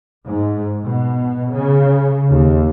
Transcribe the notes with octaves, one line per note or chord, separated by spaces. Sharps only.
G#2
B2
C#3
D#2